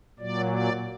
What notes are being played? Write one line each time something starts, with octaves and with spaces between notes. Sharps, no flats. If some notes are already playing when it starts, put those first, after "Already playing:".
A#2 F#3 D5
D5